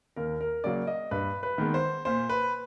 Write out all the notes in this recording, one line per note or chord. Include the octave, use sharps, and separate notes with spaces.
D#2 A#4
A#4
C#3 F#3 A#3 D5
D#5
G2 B4
B4
D#3 G#3 B3
C5
A#2 C5
B4